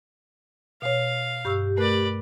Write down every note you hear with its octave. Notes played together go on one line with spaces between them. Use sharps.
B2 C#5 F5
G2 G4 C#6 E6
A3 A#4 B4 D5 F#6